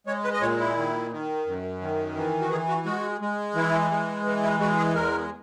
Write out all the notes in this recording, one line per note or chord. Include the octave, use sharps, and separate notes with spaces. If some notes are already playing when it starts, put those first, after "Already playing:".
G#3 C#5
B4
D#5
A#2 C#5
E4
D#3
D#3
F#2
D#3
E3
F#4
E3 G#4
F#4
G#3 F#4
G#3
E3 E4
G#3
E3
E4
G#3 F#4
G#4
E2 A#4